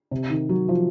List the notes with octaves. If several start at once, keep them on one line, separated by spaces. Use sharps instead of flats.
C3
D#3
F#3
F3